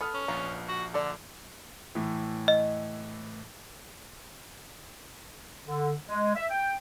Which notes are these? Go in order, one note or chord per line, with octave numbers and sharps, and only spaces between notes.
B3 A4 B5 D#6 F6
C#4
A#1 B3 F4 A#5
F#4
D3 A4 D5
A2 E3
D#5
D3
G#3
E5
G5